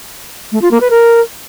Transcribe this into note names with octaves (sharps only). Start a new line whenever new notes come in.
A3
F4
A#3
B4
A#4